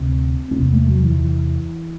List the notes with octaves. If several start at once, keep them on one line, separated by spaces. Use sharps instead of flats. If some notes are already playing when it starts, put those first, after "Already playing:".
Already playing: D2 C3 C4
C4
E2 C3 B3
A3
F#3
E3
E3